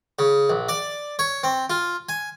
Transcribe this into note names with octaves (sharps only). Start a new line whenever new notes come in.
C#3
A#1
D5
C#5
C4
F4
G#5